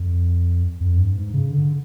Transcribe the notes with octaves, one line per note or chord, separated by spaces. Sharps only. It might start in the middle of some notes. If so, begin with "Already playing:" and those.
Already playing: F2
F2
G2
G#2
C#3
D3